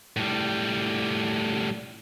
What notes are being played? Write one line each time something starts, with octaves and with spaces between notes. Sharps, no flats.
A2 G3